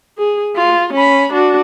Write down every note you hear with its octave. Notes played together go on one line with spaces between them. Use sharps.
G#4
F4
C#4 B5
D4 F#4